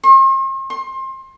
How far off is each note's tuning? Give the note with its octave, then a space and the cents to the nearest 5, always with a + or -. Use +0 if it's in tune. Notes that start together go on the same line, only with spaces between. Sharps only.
C6 +45
C6 +25